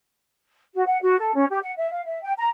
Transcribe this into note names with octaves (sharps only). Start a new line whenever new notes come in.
F#4
F#5
F#4
A4
C#4
G4
F#5
E5
F5
E5
G5
A#5